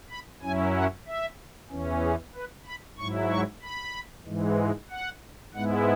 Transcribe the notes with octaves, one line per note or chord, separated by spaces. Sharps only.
B5
F#2 F#3 C#4 E4 G#5
F#5
E5
E2 E3 C#4
G#4
B4
B5
G#2 F#3 E4 C#6
C#6
B5
G#2 E3 G#3
F#5
G#2 G#3 B3 E4 F#5